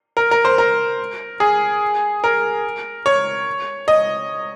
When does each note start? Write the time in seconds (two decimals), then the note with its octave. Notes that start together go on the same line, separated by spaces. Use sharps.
0.17 A#4
0.31 A#4
0.45 C5
0.58 A#4
1.40 G#4
2.24 A#4
3.06 C#5
3.88 D#5